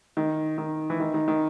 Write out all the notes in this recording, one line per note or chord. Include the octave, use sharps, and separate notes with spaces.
D#3
D#3
E3
D#3
D#3
D#3